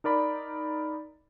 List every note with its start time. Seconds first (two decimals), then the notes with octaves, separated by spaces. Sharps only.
0.04 D#4 A#4 D5 B5